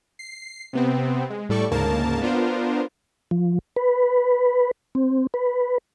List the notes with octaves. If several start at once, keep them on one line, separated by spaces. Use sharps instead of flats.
C7
C3 B3 C4
G#3
A2 G3 A4 D5 C#6
D2 G#2 C#3 A#3 A#4 A5
B3 D4 F4 A#4 C5
F3
B4
C4
B4